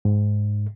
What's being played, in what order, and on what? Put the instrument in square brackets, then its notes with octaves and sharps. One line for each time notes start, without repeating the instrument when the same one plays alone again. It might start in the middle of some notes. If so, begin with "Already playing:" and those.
[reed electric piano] G#2